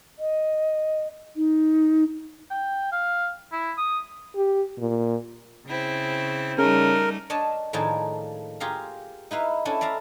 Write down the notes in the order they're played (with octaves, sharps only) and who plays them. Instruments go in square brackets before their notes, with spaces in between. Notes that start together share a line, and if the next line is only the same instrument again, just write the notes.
[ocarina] D#5
D#4
[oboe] G5
F5
E4
D#6
[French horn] G4
A#2
[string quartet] C#3 C4 E4
[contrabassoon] C#3 [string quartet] G3 A3 D#4 [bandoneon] A#4
[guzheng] D4 C#5 D#5 A5
A2 D#3 F3 A#3 D4 G#4
F4 G4 G#4 F5 A#5
D#4 E4 B4 F5
C#4 D4 E4 A4
D5 E5 F5 A#5